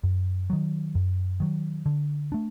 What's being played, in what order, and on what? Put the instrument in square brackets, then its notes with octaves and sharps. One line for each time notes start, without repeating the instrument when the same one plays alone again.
[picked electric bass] F#2
D#3 F#3
F#2
D#3 F#3
D3
A3 D4